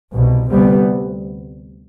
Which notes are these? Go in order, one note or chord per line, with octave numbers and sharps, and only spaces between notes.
C2 B2
D2 C3 G3 B3